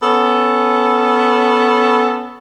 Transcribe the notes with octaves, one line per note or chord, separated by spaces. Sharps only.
B3 C#4 A4